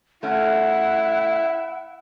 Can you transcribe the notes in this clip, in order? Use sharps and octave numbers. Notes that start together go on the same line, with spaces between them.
A3 C#4 E4 F#5